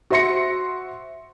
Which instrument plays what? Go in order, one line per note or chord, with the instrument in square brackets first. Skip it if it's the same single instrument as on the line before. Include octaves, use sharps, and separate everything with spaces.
[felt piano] F#4 C5 E5 C6 A#6 C#7